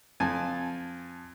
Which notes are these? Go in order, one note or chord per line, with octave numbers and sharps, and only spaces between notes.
F2 G#5 A5